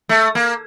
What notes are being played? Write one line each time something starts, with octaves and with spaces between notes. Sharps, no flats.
A3
A#3